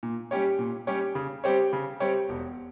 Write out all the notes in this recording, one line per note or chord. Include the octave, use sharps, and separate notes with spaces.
A#2
G3 C#4 G4 C#5
A#2
G3 C#4 G4 C#5
C#3
G3 C4 G4 C#5
C#3
G3 C4 G4 C#5
E1